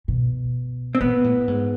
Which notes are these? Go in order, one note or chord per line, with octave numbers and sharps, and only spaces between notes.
B2
C4
A#2 B3
A2
G#2